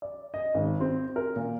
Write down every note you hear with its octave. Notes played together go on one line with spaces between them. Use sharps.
D5
D#5
G#1
C4
A#4
A#2